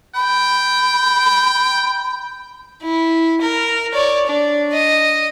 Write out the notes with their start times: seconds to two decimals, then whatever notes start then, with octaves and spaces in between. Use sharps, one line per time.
0.15 G5 B5
2.82 E4
3.41 A#4
3.93 C#5 D5
4.28 D4
4.73 D#5